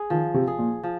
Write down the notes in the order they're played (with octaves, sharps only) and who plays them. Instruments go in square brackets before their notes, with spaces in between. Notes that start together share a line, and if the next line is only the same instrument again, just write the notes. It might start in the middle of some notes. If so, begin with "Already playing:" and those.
Already playing: [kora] G#4
[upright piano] D#3 [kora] F3
[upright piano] C3
[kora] G#4
[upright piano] A#2
[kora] F3